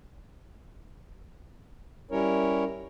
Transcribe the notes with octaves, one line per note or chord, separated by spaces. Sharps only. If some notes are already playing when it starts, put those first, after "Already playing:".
G3 C#4 E4 A#4 C#5